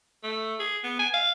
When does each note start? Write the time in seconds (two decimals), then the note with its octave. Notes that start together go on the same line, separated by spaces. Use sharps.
0.23 A3
0.59 G#4
0.83 B3
0.99 G#5
1.14 F5